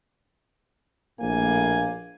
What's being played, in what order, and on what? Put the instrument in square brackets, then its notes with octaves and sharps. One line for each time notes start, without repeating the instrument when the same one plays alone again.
[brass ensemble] A#1 A2 A#3 G#5